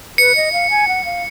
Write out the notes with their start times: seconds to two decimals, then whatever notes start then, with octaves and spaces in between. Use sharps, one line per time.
0.18 B4 C#7
0.36 D#5
0.53 F5
0.70 G#5
0.88 F#5
1.05 F5